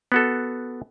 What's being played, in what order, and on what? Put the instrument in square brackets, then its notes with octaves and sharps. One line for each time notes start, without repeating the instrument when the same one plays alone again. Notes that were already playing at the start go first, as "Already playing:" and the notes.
[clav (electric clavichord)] B3 F#4 A4